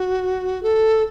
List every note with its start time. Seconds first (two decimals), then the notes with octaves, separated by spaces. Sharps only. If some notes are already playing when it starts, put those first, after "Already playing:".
Already playing: F#4
0.63 A4